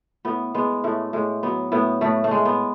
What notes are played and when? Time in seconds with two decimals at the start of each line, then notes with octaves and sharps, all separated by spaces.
0.25 A2 B3
0.55 G#3 B3
0.84 A2 A3
1.13 A2 G#3
1.43 F#3 B3
1.72 A2 B3
2.01 A2 A3
2.24 A3
2.31 G#3
2.45 B3